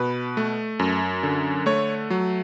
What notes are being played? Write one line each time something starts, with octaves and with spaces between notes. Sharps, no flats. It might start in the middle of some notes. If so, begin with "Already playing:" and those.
Already playing: B2 B4
A3
F#2
D3
A3 C#5
F#3